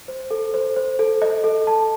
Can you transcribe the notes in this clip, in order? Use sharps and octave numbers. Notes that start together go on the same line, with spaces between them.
C5
A4
C5
C5
A4
D#5
A4
A5